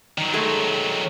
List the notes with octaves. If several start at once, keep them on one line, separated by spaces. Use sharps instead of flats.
D#3 F#3
G#3 A3 G#4